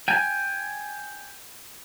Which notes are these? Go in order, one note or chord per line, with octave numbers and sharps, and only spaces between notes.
G5 G#5